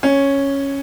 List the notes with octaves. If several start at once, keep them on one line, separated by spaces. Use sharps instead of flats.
C#4